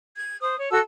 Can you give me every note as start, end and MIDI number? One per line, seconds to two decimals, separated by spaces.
0.17 0.40 92
0.41 0.55 72
0.41 0.55 87
0.58 0.69 73
0.71 0.80 66
0.71 0.80 69
0.71 0.80 81
0.71 0.80 88